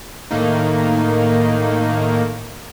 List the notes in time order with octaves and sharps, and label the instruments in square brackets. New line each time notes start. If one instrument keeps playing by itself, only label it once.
[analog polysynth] A2 D#3 A#3 D#4